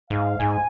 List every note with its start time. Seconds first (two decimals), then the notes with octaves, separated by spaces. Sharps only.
0.10 G#2 F5
0.39 G#2 G#5